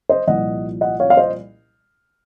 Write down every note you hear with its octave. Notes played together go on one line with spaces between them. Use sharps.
C5 D#5
C2 A#2 F3 D#5 F#5
D#5 F#5
C#5 F5
F5
C5 D#5